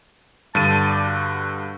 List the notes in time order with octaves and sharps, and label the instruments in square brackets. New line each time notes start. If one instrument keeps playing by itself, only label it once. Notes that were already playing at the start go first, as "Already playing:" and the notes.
[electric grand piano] G2 D3 D#7 [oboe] A5
[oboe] D5
F#4